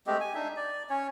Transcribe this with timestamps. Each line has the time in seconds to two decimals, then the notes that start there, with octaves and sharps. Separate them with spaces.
0.07 G#3 A3 C4 G4
0.20 G#5
0.35 D4 D#4 E5
0.56 D5
0.90 C#4 C#5